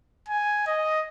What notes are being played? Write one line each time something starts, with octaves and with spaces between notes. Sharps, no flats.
G#5
D#5